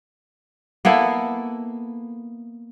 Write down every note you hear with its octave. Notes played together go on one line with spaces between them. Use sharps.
A#3 B3 E4 A4